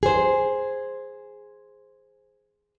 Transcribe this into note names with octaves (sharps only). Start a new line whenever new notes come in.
G#4 C5